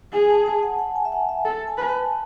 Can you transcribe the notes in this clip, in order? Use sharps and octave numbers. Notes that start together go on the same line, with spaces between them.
G#4 G#5
A5
A5
F#5
F#5
G#5
E5
F#5
E5
A4 A5
G#5
B4
A5